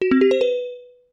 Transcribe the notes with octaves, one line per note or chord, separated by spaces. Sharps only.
F#4
C4
G4
C5
B4